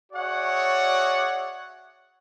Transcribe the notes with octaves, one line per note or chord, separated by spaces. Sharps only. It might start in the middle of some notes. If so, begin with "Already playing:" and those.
F#4 G#4 C#5 D5 E5 F#5